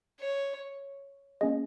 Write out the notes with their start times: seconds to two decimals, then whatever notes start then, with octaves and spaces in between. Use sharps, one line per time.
0.20 C#5
1.41 A#3 C#4 G#4 D#5